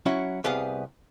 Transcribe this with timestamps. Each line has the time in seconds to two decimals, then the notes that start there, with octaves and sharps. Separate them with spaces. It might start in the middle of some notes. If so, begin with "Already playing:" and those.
0.06 F#3 C#4 E4 F#4
0.44 C2 B3 G4 G#4 F5